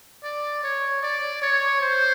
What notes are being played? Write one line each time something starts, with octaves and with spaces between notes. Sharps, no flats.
D5
C#5
D5
C#5
C5